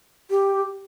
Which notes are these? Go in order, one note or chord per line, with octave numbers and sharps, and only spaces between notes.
G4